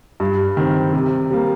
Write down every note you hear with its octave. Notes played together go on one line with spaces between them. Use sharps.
G2
D#3 C4
C3
G3 A#3